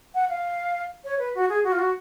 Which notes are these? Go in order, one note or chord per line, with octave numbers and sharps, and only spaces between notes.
F#5
F5
C#5
B4
F#4
G#4
F#4
F4
F#4